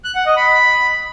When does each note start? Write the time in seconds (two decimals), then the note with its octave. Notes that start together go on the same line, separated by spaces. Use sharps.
0.04 F#6
0.15 F#5
0.26 D#5
0.37 B5